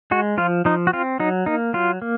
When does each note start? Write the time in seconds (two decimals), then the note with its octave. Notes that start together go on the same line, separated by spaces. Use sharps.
0.11 G#3 F#4
0.38 F3 F4
0.65 F3 D#4
0.87 F#4
0.93 C4 F4
1.20 F#3 D#4
1.46 A#3 D#4
1.74 F#3 F4
2.02 A#3